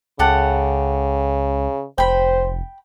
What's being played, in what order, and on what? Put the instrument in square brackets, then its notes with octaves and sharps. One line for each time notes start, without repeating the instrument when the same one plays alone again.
[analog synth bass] C#2 [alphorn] C#3 [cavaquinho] G4 A4 F#5
[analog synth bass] F1 [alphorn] C5 [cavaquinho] G5 B5